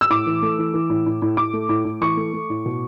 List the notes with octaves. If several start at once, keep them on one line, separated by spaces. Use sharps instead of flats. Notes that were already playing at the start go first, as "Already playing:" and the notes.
E6
A2 D6
E3
A3
E3
E3
A2
A2
A2
A2 D6
A3
A2
A2
E3 C#6
A3
A3
A2
B2